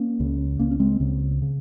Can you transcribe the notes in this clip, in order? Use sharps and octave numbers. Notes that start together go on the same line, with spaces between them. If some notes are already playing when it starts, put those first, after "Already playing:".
Already playing: A#3 C#4
C#2 C#3
C#2 C#3 A#3 C#4
C#4
G#3 C4
C#2 C#3
C#3